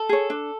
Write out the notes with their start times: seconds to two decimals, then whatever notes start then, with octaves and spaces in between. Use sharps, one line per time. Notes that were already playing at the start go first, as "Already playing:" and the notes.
Already playing: A4
0.09 G#4 C#5
0.30 D4